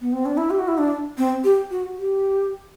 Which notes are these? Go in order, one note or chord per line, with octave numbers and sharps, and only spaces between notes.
B3
C4
D4
E4
G4
F#4
E4
D4
C4
G4
F#4
G4